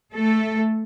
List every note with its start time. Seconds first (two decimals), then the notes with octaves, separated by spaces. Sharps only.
0.13 A3 A4